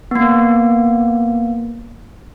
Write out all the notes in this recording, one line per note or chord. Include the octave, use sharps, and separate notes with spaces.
A#3 B3